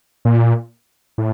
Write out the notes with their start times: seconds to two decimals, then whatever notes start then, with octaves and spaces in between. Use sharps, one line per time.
0.25 A#2
1.18 A2